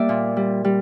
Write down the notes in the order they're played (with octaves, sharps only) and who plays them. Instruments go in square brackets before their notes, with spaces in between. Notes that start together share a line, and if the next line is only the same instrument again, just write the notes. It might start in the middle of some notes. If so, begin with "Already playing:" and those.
Already playing: [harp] G3 A#3 D5 E5 G5
A#2
G3
G3